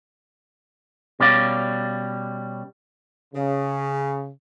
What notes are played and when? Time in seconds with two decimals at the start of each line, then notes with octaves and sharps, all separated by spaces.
1.20 B2 G3 C#4 D5 F5
3.34 C#3